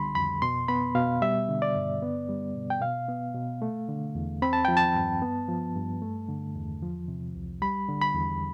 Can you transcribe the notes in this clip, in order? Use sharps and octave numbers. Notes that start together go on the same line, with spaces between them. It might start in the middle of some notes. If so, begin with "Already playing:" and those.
Already playing: C2 D3 G3 B5 C6
F2 B5
B2 C6
B3 B5
B2 F5
G3 E5
D3
D5
G2
B3
G3
B2
G5
B2 F5
B3
B2
A3
D3
E2
C4 B5
A5
F3 G5
A5
G2
B3
F3
G2
A3
D3
E2
F3
C3
C2
G3 B5
D3
B5
E2